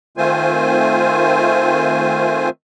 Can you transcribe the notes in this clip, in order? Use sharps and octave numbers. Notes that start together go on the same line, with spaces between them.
D#3 A3 C4 F4 C5 G#5